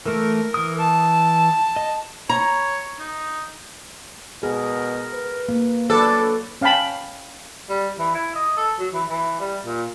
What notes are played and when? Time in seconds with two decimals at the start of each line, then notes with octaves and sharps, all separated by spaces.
0.06 E3 A3 A#4
0.54 E3 D#6
0.79 A5
1.76 D#5
2.29 C#5 A#5
2.99 D#4
4.43 B2 G#4 A#4
5.13 B4
5.49 A#3
5.90 F#3 D4 A4 B4 C#5 D5
6.61 C#4 F5 G5 A5 B5
7.69 G3
7.99 E3
8.14 E4
8.35 D#5
8.57 A4
8.79 F#3
8.94 E3
9.09 E3
9.40 G3
9.65 A#2